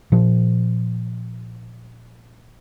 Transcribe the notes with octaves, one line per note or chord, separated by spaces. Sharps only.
A#2 F3